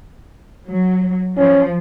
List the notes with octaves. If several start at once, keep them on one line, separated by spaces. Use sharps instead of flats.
F#3
F3 C#4